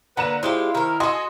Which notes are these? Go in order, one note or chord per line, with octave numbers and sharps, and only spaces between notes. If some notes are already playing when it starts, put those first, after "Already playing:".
D3 A#3 B4 F#5 A#5 E7
G#3 E4 F4 G4 C5
D#3 A#4
F#4 A4 D#5 G#5 C6